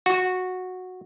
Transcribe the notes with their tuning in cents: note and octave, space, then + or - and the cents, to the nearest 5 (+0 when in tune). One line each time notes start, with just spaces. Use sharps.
F#4 -10